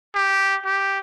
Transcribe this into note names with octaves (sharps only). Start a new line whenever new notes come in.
G4
G4